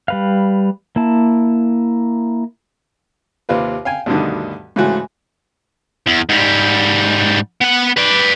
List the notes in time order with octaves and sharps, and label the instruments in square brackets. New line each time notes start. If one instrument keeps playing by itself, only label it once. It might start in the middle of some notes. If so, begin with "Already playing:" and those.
[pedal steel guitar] G3 B4 F5
A#3 E4 A5
[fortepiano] D#2 C3 F4 B4
F5 G5 G#5
D2 G2 B2 D3 D#3
G#2 C#3 E3 A3 F#4
[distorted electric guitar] E2
G#2 G3
B3 F#5
B4 D5